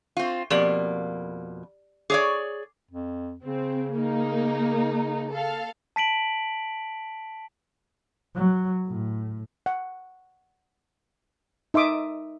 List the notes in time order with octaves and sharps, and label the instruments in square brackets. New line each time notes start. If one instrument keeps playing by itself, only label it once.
[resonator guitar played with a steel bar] C4 F4
[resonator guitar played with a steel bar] F2 B2 A#3 [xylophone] G4 D5 F#7
[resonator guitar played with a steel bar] G#4 C#5 D5 [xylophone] D6
[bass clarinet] F2
[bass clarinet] C#3 [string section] C4
[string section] A#3 D#4
A4 F5
[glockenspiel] A5 B6 D7 F#7
[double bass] F#3
A2
[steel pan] F#5
D#4 E5 C6 D6 D#6